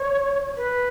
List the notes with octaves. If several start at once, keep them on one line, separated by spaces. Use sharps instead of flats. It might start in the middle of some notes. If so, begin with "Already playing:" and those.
Already playing: C#5
B4